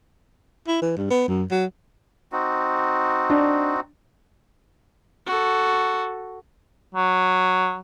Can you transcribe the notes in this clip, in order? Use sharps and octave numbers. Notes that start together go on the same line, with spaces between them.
E4
E3
G2
B3
F#2
F#3
C4 D#4 F#4
D4
F#4 A4
F#3